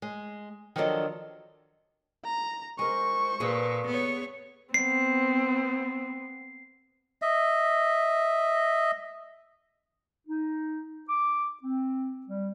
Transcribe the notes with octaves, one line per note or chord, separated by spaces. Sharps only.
G#3
D#3 F3 F#3 D4 A4 D#5
A#5
G#3 A#4 C5 C#6
A#2 G#4 A4 B4
B3 C#5
B3 C4 C7
D#5 E5
D#4
D6
C4
G3